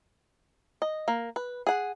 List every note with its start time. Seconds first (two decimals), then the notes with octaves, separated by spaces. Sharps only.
0.82 D#5
1.08 A#3
1.36 B4
1.67 G#4 F#5